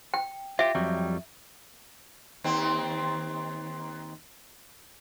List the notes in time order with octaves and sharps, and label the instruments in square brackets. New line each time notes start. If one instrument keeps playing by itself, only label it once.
[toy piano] G5
[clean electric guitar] F4 G4 [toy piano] E5
[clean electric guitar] F2 F#3 G3
[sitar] D#2 C4